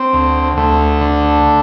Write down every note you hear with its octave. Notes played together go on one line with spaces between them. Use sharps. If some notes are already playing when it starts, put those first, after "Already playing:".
Already playing: C4
D2
D2 A3
D3